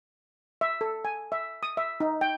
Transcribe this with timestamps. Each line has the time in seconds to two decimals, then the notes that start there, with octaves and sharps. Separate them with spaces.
0.61 E5
0.81 A4
1.05 G#5
1.32 E5
1.63 D#6
1.77 E5
2.00 D#4
2.21 G5